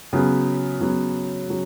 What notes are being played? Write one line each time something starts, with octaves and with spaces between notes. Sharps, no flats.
C#3 F#3 B3
C#3 F#3 B3
C#3 F#3